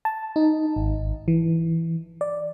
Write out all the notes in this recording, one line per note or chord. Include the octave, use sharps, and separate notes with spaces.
A5
D#4
G#1
E3
D5